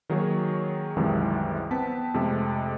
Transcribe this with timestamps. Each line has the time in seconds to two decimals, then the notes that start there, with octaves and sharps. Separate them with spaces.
0.09 D#3 F#3 A#3 G#4 C#5
0.96 C2 F#2 C3 D#3 E3 G#3
1.71 B3 C4 A5 B6
2.14 F2 C3 G#3 A3